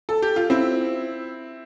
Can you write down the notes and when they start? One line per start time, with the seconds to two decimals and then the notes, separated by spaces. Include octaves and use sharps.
0.09 A4
0.22 G4
0.36 F4
0.50 C4 E4